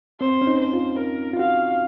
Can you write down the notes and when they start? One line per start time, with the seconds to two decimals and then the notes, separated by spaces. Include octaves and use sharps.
0.20 C4 C5
0.42 C#4
0.47 D#4
0.60 C5
0.73 F4
0.99 A#4
1.33 F4
1.39 F#4 F5